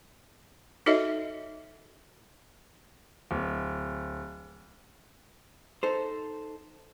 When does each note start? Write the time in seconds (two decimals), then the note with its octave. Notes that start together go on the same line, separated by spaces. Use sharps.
0.86 D#4 F#4 A4 C#5 D#5 E5
3.31 D1
5.83 D#4 A4 C5